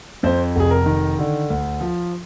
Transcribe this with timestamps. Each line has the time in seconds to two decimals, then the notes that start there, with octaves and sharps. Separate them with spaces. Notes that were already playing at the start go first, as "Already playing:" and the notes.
0.23 F2 C5
0.56 F1 G#4
0.71 A#4
0.86 D#3
1.18 D3
1.50 D2
1.81 F3